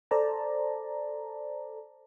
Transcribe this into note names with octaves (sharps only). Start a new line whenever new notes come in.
A4 C5 D5 A5 A#5